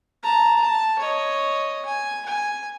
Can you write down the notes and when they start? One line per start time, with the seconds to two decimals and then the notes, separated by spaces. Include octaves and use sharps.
0.23 A5 A#5
0.61 A5
0.99 C#5 D#5
1.85 G#5
2.26 G#5